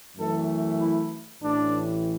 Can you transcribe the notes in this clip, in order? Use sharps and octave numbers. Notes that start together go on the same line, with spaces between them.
F#2 E3 A3 A4
E4
A1 A2 E3 D4